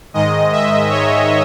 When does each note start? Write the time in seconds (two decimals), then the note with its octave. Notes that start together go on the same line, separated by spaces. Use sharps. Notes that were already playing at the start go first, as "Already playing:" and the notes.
0.14 G#2 D#3 G#3 D#5
0.52 E5
0.90 C#5